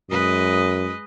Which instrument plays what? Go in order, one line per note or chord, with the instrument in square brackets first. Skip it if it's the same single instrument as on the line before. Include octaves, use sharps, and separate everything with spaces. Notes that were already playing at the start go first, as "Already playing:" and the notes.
[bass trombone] F#2 [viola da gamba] G#3 B4 D#5